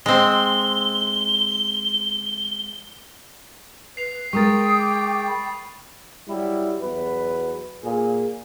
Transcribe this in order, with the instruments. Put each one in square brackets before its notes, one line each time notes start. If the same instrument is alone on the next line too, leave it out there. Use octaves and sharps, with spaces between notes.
[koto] G#3 C4 [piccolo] G7
[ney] B4 [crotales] C7 F7
[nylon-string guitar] G#3 A#4 [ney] G5 [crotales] C#6 D#6 A6
[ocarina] D#6 [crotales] C7
[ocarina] D6
B5
[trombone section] F#3 G3 E4
E2 F#3 B4
A#2 G#4